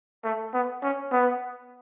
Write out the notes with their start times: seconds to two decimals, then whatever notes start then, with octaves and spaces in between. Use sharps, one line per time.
0.24 A3
0.53 B3
0.83 C#4
1.12 B3